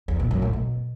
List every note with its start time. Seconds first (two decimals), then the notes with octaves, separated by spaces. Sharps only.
0.08 E2
0.19 A#2
0.31 F#2
0.42 A2
0.53 B2